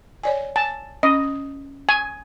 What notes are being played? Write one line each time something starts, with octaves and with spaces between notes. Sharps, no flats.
C#5 D5 G#5
G#5 A5
C#4 D#5
G#5